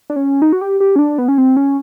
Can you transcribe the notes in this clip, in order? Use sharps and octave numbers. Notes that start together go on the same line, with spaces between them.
D4
C#4
D#4
F#4
G4
G4
C#4
D4
B3
C#4
C4
C#4